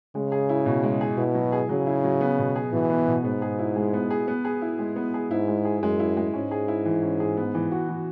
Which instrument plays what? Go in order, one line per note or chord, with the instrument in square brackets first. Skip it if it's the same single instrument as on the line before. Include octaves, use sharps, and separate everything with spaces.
[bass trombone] C#3 [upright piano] G#3
[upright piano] G#4
E4
B2
G#3
G#4
[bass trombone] B2 [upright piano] E4
[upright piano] F#3
G#4
[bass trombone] C#3 [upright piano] F#3
[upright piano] E4
F#3
B3
B2
G#4
[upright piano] B2 [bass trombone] E3
[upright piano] B3
B2
[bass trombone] G#2 [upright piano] B3
[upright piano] G#4
E4
G#3
B3
G#4
B3
G#4
E4
G#3
B3
G#4
[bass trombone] G#2 [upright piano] E4
[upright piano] G#3
G#4
[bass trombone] F#2 [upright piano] G#3
[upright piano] E4
G#3
[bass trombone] G#2 [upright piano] C#4
[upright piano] G#4
E4
E3
C#4
G#4
B3
E3
F#4
E3